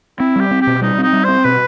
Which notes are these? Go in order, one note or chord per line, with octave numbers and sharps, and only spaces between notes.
C4 E4
G3 G4
C4
G4
B2
G3 D#4
C4 D#4
G3
C4 C5
B2 B4